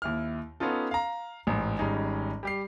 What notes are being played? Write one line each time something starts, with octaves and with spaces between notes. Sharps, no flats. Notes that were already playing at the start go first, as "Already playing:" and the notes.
D#2 E4 F6
B3 C#4 D#4 F4 A4
F5 A#5
A1 G#2
G#1 G3 C#4 D#4 G#4
G3 G4 C7